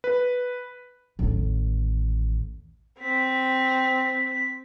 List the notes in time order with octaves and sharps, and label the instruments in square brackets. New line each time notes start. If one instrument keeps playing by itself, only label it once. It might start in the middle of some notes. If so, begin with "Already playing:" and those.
[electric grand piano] B4
[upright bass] A1 D#2
[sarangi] C4 [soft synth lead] B6